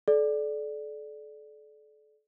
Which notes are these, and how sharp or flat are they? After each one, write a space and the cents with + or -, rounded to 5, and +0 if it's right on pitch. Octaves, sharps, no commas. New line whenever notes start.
A4 -35 D5 +0